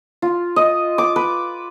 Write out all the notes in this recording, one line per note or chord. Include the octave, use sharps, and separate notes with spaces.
F4
D#5
D6
B4